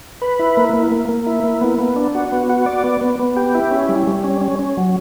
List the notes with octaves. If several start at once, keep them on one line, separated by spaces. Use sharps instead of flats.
B4
E4
A#3
A#3
A#3
A#3
E4
A#3
B3
B3
D4
F#4
B3
F#4
D5
B3
B3
B3
G4
E4
C#4
G3
G3
C#4
C#4
C#4
F#3